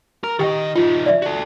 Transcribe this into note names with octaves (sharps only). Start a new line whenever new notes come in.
A#4
D#3 G4 D#5 G5
F3 D#4 F4
D5 E5
F#4 A4